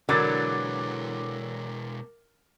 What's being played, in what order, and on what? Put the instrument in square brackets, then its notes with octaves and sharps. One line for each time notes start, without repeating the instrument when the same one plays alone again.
[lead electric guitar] B2 G#3 [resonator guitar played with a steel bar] D3 E3 F#3 [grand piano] A#4 D6 A6